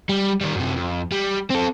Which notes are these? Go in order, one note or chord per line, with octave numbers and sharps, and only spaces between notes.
G3
D#3 G3
F#2 C3
F2
G3
C4 A4